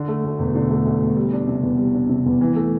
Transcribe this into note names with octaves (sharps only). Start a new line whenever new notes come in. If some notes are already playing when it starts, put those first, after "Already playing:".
Already playing: D3
A3
D2
E1
D3
A3
D2
E1
G3
D4
C3
E2
G3
D4
C3
E2
E3
A3